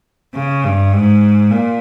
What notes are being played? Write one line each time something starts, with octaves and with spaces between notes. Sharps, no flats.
C#3
G2
G#2
A#2